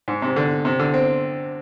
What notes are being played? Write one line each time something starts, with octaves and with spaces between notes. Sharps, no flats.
G#2
C3
D3
C3
D3
C4